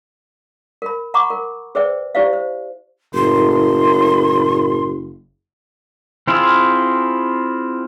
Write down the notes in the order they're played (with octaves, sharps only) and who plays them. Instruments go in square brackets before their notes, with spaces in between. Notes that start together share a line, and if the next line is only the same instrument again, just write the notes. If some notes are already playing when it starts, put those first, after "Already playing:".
[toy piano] A#4 B5
F#5 A#5 B5 C#6 D6
A#4
G#4 B4 C5 D5 E5 G5
E4 G4 C5 D5 E5 F5
C5
[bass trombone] F#1 [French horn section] A2 A#4 [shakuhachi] C6
[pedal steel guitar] C4 E4 F4 G#4